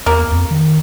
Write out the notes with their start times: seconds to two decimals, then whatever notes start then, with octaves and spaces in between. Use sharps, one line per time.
0.06 E2 A#3
0.32 F2
0.51 D#3